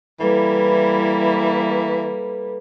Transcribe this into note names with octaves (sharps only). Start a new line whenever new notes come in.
E3 G3 A#3 E4 A4 B4